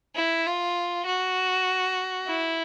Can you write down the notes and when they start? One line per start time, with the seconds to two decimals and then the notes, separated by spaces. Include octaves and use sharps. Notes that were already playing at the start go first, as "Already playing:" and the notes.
0.15 E4
0.46 F4
1.06 F#4
2.27 E4